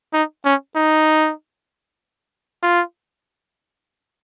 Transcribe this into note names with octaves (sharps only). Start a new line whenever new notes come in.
D#4
C#4
D#4
F4